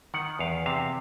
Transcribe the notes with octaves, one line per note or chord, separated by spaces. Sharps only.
D#3 F#5
E2 F5
C3 F5